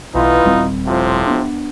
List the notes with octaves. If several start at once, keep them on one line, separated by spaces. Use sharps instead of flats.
B1 E3 B3 D#4 F4
D#1 G3 C4
A2 C3 F3
B3 D4